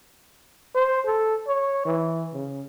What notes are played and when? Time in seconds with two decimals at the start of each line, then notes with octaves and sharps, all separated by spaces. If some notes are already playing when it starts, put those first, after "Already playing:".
0.75 C5
1.06 A4
1.47 C#5
1.86 E3
2.33 C#3